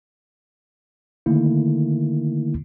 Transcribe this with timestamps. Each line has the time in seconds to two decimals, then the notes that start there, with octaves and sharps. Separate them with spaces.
1.26 D3 D#3 A3 A#3 E4